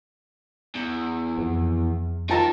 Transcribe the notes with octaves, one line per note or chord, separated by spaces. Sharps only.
E2
F2
D#4 F4 A#4 A5 A#5